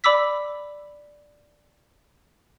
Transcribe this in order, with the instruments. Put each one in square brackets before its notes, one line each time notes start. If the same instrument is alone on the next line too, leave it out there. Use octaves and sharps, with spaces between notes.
[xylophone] D5 B5 D6 E6 B6